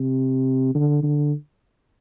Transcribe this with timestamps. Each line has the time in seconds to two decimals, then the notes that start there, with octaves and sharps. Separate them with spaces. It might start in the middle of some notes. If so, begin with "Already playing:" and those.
Already playing: C3
0.75 D3
1.03 D3